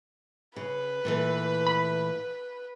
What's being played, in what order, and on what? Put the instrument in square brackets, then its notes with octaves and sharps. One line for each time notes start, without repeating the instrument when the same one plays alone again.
[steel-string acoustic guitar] C#3 [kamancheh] B4
[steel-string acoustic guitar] A#2 E3 A3
[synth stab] B5